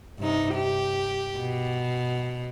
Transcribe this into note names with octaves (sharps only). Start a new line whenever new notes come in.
G2 C3 D#4
G4
B2